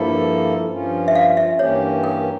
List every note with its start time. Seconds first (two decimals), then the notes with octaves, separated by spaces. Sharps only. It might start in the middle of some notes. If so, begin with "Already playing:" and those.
Already playing: G2 F3 A#3 E4 A4 F5
0.71 G2 F3 C#4 F4
1.08 E5
1.15 F5
1.37 E5
1.59 G2 E3 A#3 C#4 G4 C#5
2.04 A#4